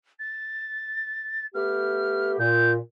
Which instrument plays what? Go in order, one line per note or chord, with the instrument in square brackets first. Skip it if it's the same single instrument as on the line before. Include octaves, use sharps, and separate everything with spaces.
[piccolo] A6
[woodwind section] A3 B3 G4 [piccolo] F6
[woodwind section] A#2 [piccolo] G6